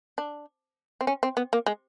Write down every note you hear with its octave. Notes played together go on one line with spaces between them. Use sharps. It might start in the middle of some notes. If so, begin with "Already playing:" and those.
D4
C4
C#4
C4
B3
A#3
G#3